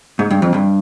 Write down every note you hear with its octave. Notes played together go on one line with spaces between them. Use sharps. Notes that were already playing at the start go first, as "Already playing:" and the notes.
G#2
G2
F2
G2